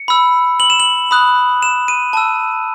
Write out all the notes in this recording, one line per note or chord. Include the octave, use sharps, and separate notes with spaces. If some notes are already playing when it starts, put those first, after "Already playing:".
Already playing: C#7
B5 E6
F#7
E7
F#7
B5 D#6 F#6
E7
D#7
A5 E6